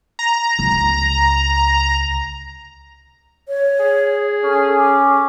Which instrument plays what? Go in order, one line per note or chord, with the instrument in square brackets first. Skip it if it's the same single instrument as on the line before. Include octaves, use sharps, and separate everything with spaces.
[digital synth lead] A#5
[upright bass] C#2
[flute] C#5
[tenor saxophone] G#4
[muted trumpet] C#4 [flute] A4
[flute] D6